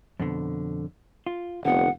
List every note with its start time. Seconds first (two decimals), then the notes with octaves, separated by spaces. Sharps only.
0.20 F2 B2 D3
1.27 F4
1.65 F1 D3 B3 F#5